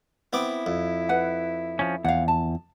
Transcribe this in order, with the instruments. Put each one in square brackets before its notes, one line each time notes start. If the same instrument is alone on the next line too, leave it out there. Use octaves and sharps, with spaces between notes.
[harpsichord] B3 C4 D6 [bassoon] E4
[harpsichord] F2
[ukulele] B4 F#5
[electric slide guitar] F3 C#4
[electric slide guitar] E2 [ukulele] F5 F#5
[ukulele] A5